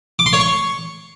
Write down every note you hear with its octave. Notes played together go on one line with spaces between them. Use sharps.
D6
C6
C#5
C#6